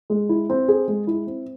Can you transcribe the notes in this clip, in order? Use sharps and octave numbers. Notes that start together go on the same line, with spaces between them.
G#3
E4
C4
G#4
G#3
E4
C4